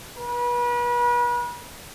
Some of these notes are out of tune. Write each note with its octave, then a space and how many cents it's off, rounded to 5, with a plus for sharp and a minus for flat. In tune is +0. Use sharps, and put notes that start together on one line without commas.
B4 -35